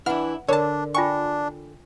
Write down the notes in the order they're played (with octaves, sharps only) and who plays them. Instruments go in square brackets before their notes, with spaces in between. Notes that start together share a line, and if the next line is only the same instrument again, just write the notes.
[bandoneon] E3 [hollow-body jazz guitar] D4 E4 [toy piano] B4 F#5 [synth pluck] F6
[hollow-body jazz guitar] D3 [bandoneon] D4 [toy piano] A#4 [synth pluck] C#5 A5
[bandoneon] D4 [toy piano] F4 G5 G#5 [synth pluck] C#6